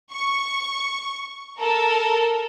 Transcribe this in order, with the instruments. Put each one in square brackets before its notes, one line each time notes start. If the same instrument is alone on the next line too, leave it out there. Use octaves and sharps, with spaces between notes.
[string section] C#6
A4 A#4